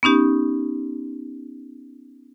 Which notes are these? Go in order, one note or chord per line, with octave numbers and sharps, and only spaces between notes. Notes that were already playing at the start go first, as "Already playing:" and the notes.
B3 C#4 D#4 G4